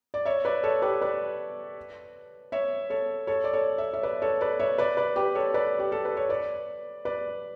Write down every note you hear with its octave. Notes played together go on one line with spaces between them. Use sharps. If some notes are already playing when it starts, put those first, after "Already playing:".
D5
C#5 E5
B4 D5
A4 C#5
G4 B4
B4 D5
C#5 E5
A4 C#5
A4 C#5
D5
A4 C#5
E5
C#5 E5
B4 D5
A4 C#5
B4 D5
C#5 E5
B4 D5
B4 D5
G4 B4
A4 C#5
B4 D5
G4
A4
B4
C#5
B4 D5
B4 D5